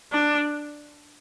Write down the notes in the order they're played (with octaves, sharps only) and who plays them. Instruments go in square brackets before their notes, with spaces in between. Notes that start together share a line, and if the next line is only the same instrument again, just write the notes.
[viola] D4